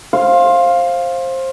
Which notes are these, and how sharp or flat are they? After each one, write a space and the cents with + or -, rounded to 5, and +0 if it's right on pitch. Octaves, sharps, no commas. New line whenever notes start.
C5 +20 F5 +0